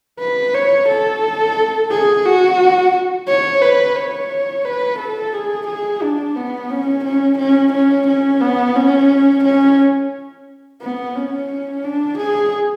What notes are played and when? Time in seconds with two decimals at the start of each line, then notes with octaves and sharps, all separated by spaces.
0.20 B4
0.54 C#5
0.88 A4
1.91 G#4
2.25 F#4
3.28 C#5
3.62 B4
3.96 C#5
4.65 B4
4.99 A4
5.33 G#4
5.67 G#4
6.02 D4
6.36 B3
6.71 C#4
7.05 C#4
7.39 C#4
7.73 C#4
8.07 C#4
8.41 B3
8.76 C#4
9.44 C#4
10.82 B3
11.15 C#4
11.84 D4
12.18 G#4